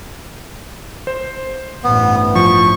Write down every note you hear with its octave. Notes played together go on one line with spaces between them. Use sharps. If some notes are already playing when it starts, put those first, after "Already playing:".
C5
A1 G2 B3
F3 C#6